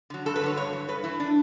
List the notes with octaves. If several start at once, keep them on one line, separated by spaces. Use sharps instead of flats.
D3 F#3
G2 A4
B4
D3 F#3 C#5
G2 C#5
E3
G2 B4
E3 E4
D4